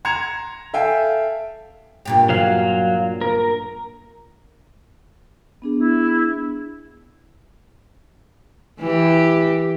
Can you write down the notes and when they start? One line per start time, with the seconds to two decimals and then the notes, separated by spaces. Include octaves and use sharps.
0.05 A#5 C6 G#6 C#7 E7 F7
0.73 A4 E5 F5 G5 G#5
2.05 G2 A#2 G4
2.29 F#3 F5
3.21 A#4
5.62 B3 D4 G#4
5.77 E4
8.80 E3 G4